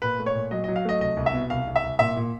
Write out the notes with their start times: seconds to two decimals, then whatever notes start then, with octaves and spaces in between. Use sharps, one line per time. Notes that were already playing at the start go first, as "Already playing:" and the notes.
0.02 A#2 B4
0.19 A3
0.26 C#5
0.35 A#2
0.51 F#3 D#5
0.64 D#5
0.68 F#3
0.76 F5
0.85 A3 D#5
1.01 C2 D#5
1.17 C2
1.26 E5
1.33 B2
1.50 C2 F5
1.67 C2
1.76 E5
1.84 C2
1.99 A#2 E5
2.16 A#2